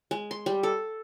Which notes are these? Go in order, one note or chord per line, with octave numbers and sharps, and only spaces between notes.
G#3
C6
G3
A4